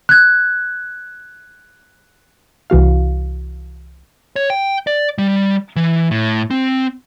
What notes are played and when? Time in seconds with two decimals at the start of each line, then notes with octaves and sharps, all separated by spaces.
0.09 F#6 G#6
2.70 C2 E3 F#4 F5
4.36 C#5
4.50 G5
4.87 D5
5.18 G3
5.76 E3
6.11 A2
6.51 C4